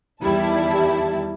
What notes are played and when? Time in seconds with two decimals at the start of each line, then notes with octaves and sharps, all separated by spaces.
0.23 E2 D#3 G3 E4 A5